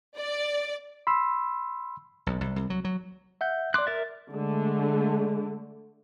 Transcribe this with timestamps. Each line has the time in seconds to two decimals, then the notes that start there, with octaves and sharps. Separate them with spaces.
0.18 D5
1.07 B5 C6 E6
2.27 B1
2.41 C2
2.56 C2
2.70 F#3
2.85 F#3
3.41 E5 F#5 G6
3.74 D5 C6 D6 F#6
3.87 A#4 E5 A6
4.33 D3 G#3 A3